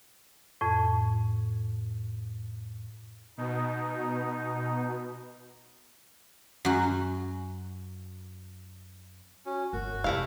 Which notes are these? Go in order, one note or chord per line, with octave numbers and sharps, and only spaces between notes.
F2 A2
B2 D#4
F#2 F#4
C#4 F#4
G1 F#4 A#4
F1 A3 E4 G4 F5